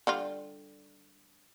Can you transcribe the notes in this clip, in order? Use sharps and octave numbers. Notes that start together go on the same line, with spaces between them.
D3 G3 F4